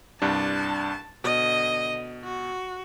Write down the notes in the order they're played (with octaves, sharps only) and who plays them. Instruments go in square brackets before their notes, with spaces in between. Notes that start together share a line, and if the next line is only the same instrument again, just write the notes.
[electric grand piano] C2 G2 D4 [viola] A5
[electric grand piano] B2 [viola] D3 D#5
[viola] F#4